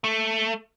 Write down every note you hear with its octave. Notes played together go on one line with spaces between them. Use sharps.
A3